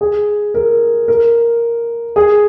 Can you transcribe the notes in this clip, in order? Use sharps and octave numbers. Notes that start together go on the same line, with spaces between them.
G#4
A#4
A#4
G#4